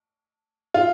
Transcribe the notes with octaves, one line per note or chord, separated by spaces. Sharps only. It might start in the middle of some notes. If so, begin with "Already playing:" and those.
F4